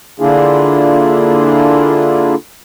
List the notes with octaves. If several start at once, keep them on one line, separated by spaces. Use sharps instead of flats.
D3 A#3 D4 E4 F4 G#4